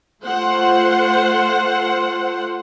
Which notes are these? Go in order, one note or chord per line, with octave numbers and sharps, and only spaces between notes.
A3 F4 C5 F#5